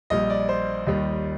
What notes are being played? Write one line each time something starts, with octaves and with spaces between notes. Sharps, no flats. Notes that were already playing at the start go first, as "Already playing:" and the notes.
A#1 A#2 G3 D#5
D5
C5
D#2 D#3 G3 D#5